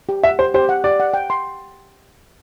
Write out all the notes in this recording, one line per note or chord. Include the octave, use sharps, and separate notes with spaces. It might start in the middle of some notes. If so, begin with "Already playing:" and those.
G4
E5 F#5
G4 C5
G4 C5
F#5
G4 D5
F#5
G5
C6